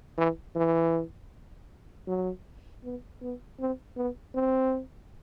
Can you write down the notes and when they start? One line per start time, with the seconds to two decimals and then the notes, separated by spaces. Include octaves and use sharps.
0.17 E3
0.56 E3
2.07 F#3
2.84 B3
3.22 B3
3.59 C4
3.97 B3
4.34 C4